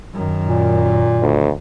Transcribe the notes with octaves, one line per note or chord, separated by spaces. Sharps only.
F#2 D#3
A#2
D2